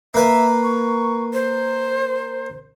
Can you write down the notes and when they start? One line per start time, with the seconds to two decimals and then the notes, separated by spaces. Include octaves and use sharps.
0.14 A#3 B4 E5
0.63 C#6
1.33 C5